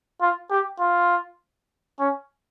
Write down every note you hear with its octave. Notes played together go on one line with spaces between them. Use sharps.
F4
G4
F4
C#4